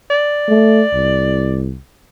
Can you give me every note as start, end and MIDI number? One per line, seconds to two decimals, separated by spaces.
0.10 1.63 74
0.48 0.84 57
0.94 1.78 36